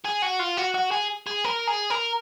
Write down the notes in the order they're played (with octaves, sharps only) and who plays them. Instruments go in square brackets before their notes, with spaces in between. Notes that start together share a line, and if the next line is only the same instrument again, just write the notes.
[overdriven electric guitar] G#4
F#4
F4
F#4
F#4
G#4
G#4
A#4
G#4
A#4